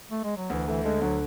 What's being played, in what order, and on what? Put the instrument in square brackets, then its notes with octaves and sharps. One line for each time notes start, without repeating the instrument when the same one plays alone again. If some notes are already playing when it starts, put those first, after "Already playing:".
[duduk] A3
G#3
F#3
[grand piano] D2 [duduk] E3
[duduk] E3 [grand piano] A3
[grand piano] D3 [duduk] G#3
[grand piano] D2 [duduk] F#3